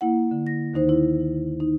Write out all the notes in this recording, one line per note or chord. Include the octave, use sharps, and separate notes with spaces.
A#3 E4 F#5
D3
A#6
D#2 D#3 D#4 C5
E4
D#4